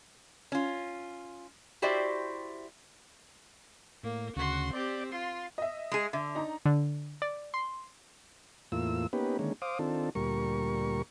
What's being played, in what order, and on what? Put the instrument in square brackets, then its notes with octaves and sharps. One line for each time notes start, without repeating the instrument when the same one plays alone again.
[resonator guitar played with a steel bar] C#4 F4
E4 F#4 G4 C5 D5 E5
[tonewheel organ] A2 [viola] A#3
[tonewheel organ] D2 C#3 [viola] F#4 C6
[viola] C4 G4 [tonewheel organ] D5
[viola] F4 [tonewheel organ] C6
[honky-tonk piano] D#5 E5
[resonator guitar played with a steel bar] G#3 G#4
[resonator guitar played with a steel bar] D3 [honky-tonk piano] E5
[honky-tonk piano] D#4 A#5
[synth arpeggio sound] D3
D5
C6
[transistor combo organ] E2 A2 A#3 F4 E6
A#3 B3 C#4 D#4 G4 B4
D3 D#3 G#3 A#3 C#4
C5 F5 D6 D#6
D#3 C4 D4 F4 A4
D2 A#2 G3 A#4 C#6